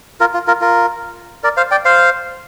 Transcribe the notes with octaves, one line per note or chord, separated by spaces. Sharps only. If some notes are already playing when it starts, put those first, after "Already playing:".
F4 A#4
F4
F4 A#4
F4 A#4
A#4 D5
C5 F5
D5 G5
C5 F5